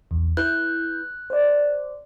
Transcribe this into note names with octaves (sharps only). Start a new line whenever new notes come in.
A#1 E2
E4 B4 F#6 G6
C5 D5